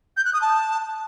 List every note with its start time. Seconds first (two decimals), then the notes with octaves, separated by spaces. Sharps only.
0.17 G6
0.25 F#6
0.33 D#6
0.42 A5